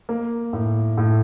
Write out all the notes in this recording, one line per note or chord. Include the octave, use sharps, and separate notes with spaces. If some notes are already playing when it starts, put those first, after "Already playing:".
A#3
A2
A2